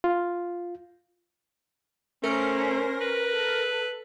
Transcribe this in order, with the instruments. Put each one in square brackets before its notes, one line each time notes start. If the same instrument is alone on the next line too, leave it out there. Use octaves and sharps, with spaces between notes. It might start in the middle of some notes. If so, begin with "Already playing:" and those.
[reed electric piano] F4
[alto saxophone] A3 [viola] C#4 C5 [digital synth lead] A#4
[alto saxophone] B4
[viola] A4